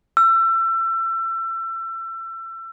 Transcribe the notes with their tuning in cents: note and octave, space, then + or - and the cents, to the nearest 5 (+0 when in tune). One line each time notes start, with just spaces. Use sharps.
E6 +30